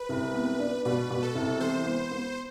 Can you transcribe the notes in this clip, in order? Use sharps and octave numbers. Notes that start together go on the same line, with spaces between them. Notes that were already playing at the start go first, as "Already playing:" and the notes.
Already playing: B4
C2
B3
D4
B2 B4
B2
A4
C2
E3 C5
B3
B3